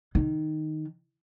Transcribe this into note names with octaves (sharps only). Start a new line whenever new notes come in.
D#3